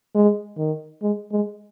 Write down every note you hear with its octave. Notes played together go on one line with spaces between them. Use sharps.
G#3
D#3
G#3
G#3